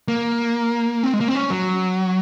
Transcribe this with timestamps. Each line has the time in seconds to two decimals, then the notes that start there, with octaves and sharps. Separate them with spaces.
0.08 A#3
1.03 C4
1.13 G#3
1.20 A#3
1.28 C4
1.35 C#4
1.50 F#3